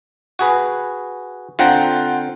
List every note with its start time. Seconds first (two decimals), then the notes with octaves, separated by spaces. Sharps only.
0.39 F#4 G#4 B4
1.59 D3 C4 F4 F#5 G5 A#5